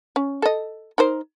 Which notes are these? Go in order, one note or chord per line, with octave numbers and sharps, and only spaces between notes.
C#4
A4 D#5
D#4 A#4 C5